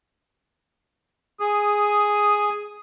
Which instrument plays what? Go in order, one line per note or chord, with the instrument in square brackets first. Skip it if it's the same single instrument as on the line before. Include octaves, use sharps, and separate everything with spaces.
[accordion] G#4 [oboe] D#6